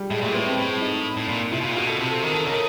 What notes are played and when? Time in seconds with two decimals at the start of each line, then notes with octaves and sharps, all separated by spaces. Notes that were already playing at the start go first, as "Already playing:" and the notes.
Already playing: G3
0.10 A2 G#3
0.21 A#2 A3
0.32 A2 B3
0.46 C4
0.57 A2
0.82 D#4
1.17 A2
1.29 A#2
1.52 C3 E4
1.60 B2
1.63 F4
1.68 A#2
1.76 B2 F#4
1.87 A4
1.99 C3
2.10 A4
2.23 D#3 A#4
2.34 A4
2.46 C#3 A#4